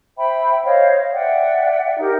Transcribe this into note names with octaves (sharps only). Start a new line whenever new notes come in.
C5 E5 G5 B5
C5 C#5 D#5 F5
D5 E5 F#5 G5
D#4 G4 A#4